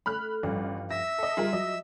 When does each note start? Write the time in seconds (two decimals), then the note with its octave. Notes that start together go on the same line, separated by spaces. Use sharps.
0.06 A3 B5 F6 F#6
0.43 A1 G2 F3
0.91 E5 E6 A#6
1.18 A4 D#5
1.37 G3 F4 G#4 A#4
1.53 F#3 D#5